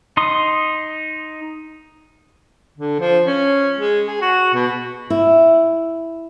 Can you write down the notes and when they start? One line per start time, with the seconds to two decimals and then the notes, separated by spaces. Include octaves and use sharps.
0.17 D#4 C6 D#6
2.77 D3
2.99 F3
3.26 C#4
3.78 G#3
4.07 G#4
4.21 F#4
4.54 B2
5.10 E4